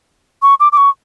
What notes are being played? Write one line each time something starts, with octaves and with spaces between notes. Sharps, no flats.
C#6
D6
D6
C#6